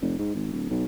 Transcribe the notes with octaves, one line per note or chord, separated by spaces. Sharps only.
F1
G#2
G#1
D1
B1